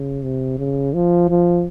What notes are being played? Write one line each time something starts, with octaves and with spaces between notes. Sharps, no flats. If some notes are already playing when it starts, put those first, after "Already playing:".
Already playing: C#3
C3
C#3
F3
F3